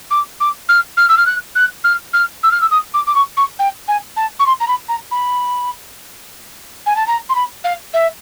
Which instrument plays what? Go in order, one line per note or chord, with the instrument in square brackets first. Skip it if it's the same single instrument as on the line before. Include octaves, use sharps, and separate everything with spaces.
[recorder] D6
D6
F6
F6
E6
F6
F#6
F#6
F6
F6
E6
F6
E6
D#6
D6
D6
C#6
C#6
G5
G#5
A5
C#6
C6
A#5
B5
A#5
B5
G#5
A5
A#5
C6
B5
F5
E5